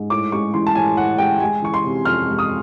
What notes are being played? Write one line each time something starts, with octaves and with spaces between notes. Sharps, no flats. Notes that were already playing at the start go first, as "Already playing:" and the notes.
Already playing: G#2 G#3
A2 D6
G#3 C#6
E3 C6
A5
A2 G#5
A2 F#5
G#3 G5
G#3 G#5
E3 C#6
C6
C3
F2 F6
G#3
D#6